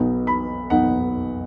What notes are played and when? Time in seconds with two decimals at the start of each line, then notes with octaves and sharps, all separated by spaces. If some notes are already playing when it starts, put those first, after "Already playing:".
Already playing: B1 B2 B3 D#4
0.27 B5
0.70 B1 B2 B3 D#4 F#5